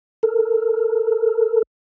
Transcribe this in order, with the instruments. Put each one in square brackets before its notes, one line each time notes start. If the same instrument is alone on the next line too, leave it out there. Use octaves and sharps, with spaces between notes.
[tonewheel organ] A4 A#4